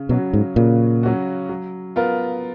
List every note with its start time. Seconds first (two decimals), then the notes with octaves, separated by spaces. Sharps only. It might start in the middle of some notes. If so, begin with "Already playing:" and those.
Already playing: C#3
0.09 B2 F#3 C#4 F#4
0.33 G#2
0.56 A#2 C#3
1.03 F#3 C#4 F#4
1.49 F#3
1.96 B3 F4 A#4